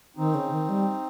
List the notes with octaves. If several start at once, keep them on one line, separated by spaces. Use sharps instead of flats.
D#3 C4 D#4
C#3
D#3
G3